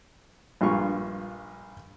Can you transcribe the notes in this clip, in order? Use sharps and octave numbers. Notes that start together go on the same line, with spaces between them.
A#1 G2 F4 C#6